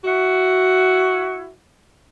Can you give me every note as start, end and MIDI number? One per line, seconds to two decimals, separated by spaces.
0.04 1.52 64
0.04 1.52 66